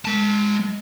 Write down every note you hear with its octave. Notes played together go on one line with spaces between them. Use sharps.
G#3 A5